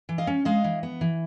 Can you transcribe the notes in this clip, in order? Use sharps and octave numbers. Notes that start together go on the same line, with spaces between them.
E3
D#5 F5
C#4
G#3 D#5 F5
E3
B3
E3